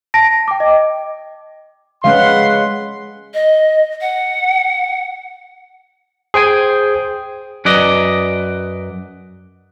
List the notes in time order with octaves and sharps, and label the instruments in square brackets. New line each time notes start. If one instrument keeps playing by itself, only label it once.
[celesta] A5 A#6 D7
G5 D6
D#5
[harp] G#3 [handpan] C#4 F5 [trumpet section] B4 F#5 C6
[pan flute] D#5
F#5
[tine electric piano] G#4 C5 G5 G#5
[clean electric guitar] F#2 B4 D5 D#5